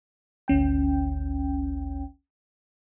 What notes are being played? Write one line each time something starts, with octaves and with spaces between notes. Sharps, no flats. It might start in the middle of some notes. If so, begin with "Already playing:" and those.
G#1 D2 C#4 G5